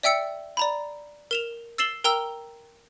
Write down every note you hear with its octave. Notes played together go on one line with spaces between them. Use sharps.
D5 E5 G5 E6 C#7
D5 A#5 B5
A#4 E7 F7
E6 A6 C7 E7 F#7 G7
A#4 G5 A#5 E6 G7